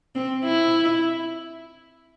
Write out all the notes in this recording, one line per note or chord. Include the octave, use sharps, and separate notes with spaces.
C4
E4